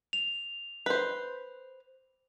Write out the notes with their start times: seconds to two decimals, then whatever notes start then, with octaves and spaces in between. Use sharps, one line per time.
0.13 F7
0.86 B4 C5